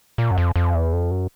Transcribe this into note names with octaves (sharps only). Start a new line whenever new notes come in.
A#2
F#2
F2
F2
E2
F2
F#2